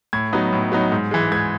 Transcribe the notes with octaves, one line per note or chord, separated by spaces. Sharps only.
A2 G#6
F#3 B3 D#4
A2
F#3 B3 D#4
G#2
E3 G#3
G#2 G#6